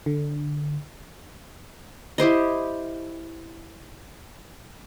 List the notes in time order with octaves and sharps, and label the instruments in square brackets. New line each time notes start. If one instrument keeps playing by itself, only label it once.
[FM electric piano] D3
[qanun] E4 G4 C5 D#5